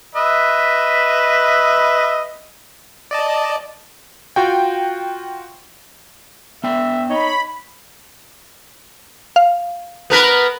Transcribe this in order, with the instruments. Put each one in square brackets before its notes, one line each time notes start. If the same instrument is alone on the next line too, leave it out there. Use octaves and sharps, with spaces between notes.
[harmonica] B4 D#5 E5
[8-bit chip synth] D5 D#5 A5
[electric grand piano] F4 F#4 G5
[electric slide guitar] B3 D5 G5 [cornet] E5
[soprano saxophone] D#4 [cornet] C#5 [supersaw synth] B5
[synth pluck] F5
[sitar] B3 A#4 B4